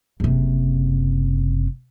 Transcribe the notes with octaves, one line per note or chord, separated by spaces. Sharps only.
F#1 C3